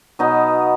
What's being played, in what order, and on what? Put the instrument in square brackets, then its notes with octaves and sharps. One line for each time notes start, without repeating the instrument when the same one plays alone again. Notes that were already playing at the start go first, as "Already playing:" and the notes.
[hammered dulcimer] B2 F#3 B3 D#4